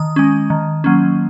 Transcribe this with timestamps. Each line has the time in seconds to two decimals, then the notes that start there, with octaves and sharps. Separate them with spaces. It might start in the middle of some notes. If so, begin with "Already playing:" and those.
Already playing: D#3 D#6
0.16 G#3 C#4
0.50 D#3
0.84 F#3 A#3 C#4